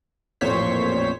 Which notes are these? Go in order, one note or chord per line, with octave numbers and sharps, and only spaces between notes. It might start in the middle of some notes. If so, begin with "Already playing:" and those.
A1 F2 A#2 C5 C#5 B6